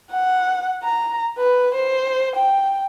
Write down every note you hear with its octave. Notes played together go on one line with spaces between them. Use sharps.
F#5
A#5
B4
C5
G5